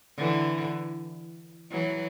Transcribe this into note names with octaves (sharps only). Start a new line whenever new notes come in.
D3 E3
E3 F#3